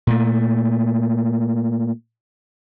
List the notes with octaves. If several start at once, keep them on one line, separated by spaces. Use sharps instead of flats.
A#2 A3